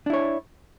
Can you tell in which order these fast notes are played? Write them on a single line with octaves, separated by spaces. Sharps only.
D4 E4 C#5